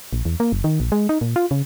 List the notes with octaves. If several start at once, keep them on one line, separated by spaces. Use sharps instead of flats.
A#1
E2
A#3
F#1
D#3
A#1
G#3
D#4
A#2
F4
C#3